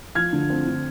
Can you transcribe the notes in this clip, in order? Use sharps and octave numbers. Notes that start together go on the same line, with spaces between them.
F3 F6 G#6
D3
C4
D3